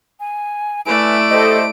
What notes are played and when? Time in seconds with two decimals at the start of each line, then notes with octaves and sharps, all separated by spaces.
0.20 G#5
0.87 A3 E4 B4 D5 G#5 D7
1.29 G4 A4 C5 D#5 E5